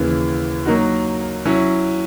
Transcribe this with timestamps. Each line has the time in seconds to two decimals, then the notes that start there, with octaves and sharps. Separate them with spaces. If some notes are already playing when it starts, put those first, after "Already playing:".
Already playing: D#2 C#3 E3
0.66 F#3 A#3 D#4 F#4
1.45 F#3 C#4 E4